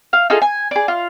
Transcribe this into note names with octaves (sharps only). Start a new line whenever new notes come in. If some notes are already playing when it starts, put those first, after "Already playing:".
F5
D#4 F4 G#4 A4
G#5
G#4 D5
F4